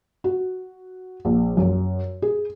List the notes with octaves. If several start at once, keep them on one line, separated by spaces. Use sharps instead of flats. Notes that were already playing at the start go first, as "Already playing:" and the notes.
F#4
A#1
F#2
G#4